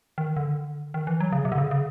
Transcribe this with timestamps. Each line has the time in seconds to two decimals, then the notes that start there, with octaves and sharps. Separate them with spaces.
0.18 D#3
0.37 D3
0.94 D#3
1.07 E3
1.20 F#3
1.32 C#3
1.45 C3
1.52 D3
1.58 C#3
1.71 C#3